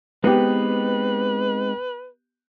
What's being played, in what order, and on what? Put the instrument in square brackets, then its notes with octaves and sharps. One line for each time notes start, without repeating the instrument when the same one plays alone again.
[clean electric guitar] G#3 C4 D#4 [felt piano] B3 G4 [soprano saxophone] B4